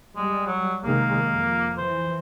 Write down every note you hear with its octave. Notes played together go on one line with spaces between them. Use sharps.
G3 G#3
F#3
C3 D#3 G#3 A#3
F2
E3 C5